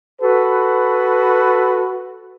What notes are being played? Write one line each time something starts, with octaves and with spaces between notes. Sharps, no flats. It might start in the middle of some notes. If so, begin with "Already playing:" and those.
F#4 A4 B4